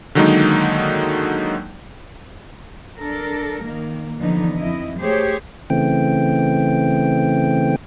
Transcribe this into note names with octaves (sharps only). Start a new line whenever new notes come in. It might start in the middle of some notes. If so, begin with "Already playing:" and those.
D3 D#3 F#3 G#3 A#3 D#4
D4 A4 A#4
D#3 A#3
D3 E3 F3 B3 D#4
F2 E4 D#5
A3 G4 G#4 C5 C#5
C#3 E3 A3 C4 G5